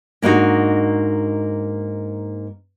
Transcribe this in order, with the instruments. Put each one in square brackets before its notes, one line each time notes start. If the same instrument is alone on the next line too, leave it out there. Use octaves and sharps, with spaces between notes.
[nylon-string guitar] G#2 A#3 D4 D#4 F#4